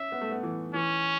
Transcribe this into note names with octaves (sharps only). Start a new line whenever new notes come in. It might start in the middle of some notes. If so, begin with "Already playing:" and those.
Already playing: C#4 E5
B3
A3
B3
E3
E3 C#4